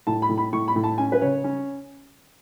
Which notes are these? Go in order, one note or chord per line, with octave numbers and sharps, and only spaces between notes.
A2 A5
B5
A2
B5
A2 C#6
B5
A2
A5
C#4 G#5
B4
C#3 C#5
C#4